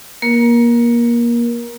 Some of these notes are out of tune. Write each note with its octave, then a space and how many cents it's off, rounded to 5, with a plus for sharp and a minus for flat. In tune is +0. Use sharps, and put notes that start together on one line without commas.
A#3 +25 A#4 +20